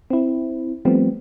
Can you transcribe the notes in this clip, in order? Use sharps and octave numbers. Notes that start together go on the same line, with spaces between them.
C4 E4
F3 G3 A3 B3 C4